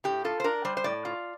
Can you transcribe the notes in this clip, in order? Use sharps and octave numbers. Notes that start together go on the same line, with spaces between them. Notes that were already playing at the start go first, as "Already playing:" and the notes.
A2 G4
F4 A4
C5
D4 A#4
G3 C5
C5
A2 D5
F4